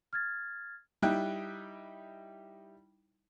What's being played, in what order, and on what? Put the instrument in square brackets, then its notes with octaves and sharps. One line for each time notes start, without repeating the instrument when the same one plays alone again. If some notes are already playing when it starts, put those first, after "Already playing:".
[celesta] F6 G#6 A6
[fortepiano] G3 D#4 E4 G5 F#6